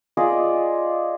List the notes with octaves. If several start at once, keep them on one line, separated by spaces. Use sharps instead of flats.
F4 G#4 D5 D#5